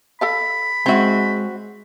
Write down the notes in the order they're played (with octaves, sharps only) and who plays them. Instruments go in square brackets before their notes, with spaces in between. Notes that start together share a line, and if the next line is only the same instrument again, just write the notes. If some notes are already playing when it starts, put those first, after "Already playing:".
[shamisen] A4 D5 F5 [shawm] B5
[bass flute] G#3 [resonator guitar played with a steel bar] C4 F#4 [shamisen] C#5 E5